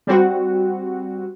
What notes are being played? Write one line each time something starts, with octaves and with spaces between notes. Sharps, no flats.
G3 C4 F#4